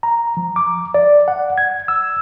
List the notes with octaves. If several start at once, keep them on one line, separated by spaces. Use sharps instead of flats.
A#5
F3
D6
D5
F#5
G#6
E6